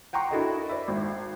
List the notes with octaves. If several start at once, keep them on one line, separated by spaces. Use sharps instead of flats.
F#5 G5 A#5 C6 C#6
D4 E4 F#4 A4 A#4 D#5
C5 D5 E5 B5
G#1